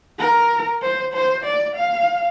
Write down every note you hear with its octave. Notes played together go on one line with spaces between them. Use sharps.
A#4
C5
C5
D5
F5